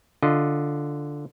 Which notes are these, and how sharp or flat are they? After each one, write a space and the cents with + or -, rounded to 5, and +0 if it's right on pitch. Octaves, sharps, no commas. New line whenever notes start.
D3 +0 F4 +0 D#5 +0